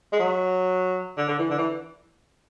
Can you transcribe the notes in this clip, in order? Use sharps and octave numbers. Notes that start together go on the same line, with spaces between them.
G#3
F#3
D3
D3
E3
D3
E3